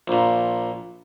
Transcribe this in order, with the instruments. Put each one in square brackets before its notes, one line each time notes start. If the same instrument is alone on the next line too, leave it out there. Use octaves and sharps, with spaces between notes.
[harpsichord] A#1 A#2